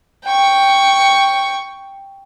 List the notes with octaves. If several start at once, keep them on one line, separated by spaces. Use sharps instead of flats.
G5 C#6